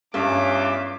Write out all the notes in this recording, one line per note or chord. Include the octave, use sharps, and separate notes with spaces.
E2 G2 C#4 F4 E5 D6